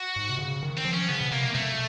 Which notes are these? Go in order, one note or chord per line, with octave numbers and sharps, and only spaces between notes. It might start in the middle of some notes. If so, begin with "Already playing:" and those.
Already playing: F#4
G#2
C3
C#3
D#3
C4
F3
C#4
C#3 B3
B2
C3 A#3
B2 A3